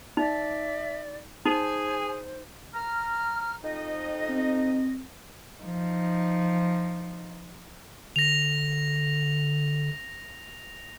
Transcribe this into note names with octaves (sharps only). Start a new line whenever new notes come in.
D#4 D5 E5
D#4 G#4 C5 G#5
A#5 F6
F2 D#4 D#5
C4
F3 D#4
D3 A#6 F7